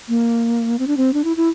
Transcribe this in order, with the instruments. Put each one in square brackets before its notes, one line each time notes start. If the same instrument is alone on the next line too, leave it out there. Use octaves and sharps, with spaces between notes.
[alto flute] A#3
C4
D4
C4
D4
E4
E4